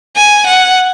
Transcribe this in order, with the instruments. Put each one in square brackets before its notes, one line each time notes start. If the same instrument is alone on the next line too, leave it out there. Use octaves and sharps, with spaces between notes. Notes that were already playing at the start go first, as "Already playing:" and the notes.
[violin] G#5
F#5